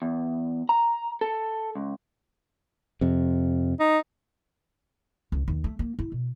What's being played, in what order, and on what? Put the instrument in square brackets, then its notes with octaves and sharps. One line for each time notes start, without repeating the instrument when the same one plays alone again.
[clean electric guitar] E2
A#5
A4
C#2
[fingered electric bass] F2 C3
[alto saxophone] D#4
[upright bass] C#2
D#2
A3
A#3
E4
B2